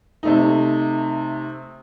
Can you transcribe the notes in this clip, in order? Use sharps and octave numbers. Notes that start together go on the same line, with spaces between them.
C3 A3 D#4